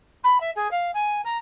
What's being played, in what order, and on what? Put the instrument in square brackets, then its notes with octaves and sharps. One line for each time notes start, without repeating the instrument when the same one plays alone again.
[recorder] B5
E5
G#4
F5
G#5
A#5